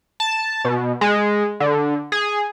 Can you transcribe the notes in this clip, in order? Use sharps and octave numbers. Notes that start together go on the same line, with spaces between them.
A5
B2
G#3
D3
G#4